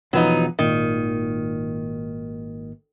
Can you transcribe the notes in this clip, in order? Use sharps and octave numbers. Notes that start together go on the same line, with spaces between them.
E1 E2 F3 F#3 B3 D#4
G#1 A#2 D#3